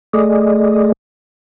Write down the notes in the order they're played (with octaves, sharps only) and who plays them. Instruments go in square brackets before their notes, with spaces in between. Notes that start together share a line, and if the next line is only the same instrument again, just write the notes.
[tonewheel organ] A3 G#4 D5 D#5